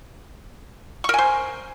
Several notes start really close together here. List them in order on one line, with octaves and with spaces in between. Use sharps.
C#6 A#4 G#5 C5